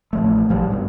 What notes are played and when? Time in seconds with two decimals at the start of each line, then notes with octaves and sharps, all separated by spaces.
0.13 A1 F3 A3
0.49 A#1 F3 G3
0.70 G#1 G2 B2